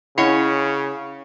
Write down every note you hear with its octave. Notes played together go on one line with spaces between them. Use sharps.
C#3 C#4 E4 C#5 D#5 F#5